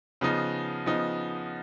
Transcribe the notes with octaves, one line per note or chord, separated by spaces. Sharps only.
C#3 F3 B3 D#4
C#3 F3 B3 D#4